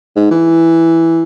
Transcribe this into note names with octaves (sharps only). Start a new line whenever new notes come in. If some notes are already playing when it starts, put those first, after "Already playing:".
G#2
E3